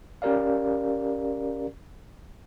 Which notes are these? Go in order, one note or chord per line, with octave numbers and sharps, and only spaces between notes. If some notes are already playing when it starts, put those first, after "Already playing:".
C#4 G4 A#4 D5 F5